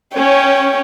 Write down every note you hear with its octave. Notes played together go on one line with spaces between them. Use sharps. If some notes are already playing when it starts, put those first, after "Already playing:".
C#4 C#5 G5